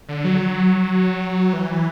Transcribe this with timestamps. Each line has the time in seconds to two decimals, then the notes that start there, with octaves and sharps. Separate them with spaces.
0.09 D3
0.24 F#3
1.53 E3